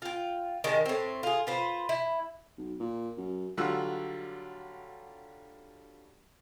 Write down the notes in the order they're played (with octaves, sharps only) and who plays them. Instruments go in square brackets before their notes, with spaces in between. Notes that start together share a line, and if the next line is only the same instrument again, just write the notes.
[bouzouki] F4 G5
D#3 G3 G#3 D4
A2 C4
F4 G#4
F4 B4 C5
E4
[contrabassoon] B1
A#2
F#2
[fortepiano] D3 F#3 G3 F4 E6 F#6